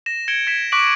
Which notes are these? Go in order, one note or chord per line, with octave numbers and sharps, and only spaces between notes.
A#6 E7
G#6 C#7 D7 E7 G7
G#6 B6 E7
C#6 D6 F#6 B6 D7 F#7